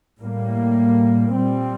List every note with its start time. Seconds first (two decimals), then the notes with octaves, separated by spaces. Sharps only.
0.21 A2 G3 A#3
1.35 A#2 G3 C4